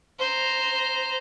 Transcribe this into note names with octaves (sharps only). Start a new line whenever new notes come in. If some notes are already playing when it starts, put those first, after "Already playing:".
C5 A#5